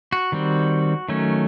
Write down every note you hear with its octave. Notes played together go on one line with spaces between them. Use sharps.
F#4
D#3 G3 C4
D#3 F#3 A3 C#4